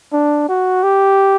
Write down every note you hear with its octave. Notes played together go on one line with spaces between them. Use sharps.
D4
F#4
G4